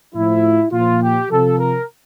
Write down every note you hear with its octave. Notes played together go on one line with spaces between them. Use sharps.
A2 F3 E4
A#2 F3 F4
G4
C3 F3 A4
A#4